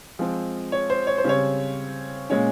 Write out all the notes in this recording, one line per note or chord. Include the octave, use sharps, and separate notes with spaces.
F3 G#3 C4
C#5
C5
C#5
C5
C#3 G3 C4 C#5
A#2 G#3 C#4 C#5